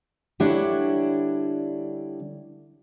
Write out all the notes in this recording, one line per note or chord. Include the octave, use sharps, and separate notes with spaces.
D3 G3 D4 E4 C#5